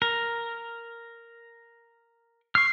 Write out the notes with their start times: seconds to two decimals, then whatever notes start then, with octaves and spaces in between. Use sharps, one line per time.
0.02 A#4
2.55 C#6 F6 C7